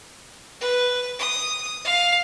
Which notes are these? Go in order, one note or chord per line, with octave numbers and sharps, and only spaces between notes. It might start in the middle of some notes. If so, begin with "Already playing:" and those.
B4
D#6
F5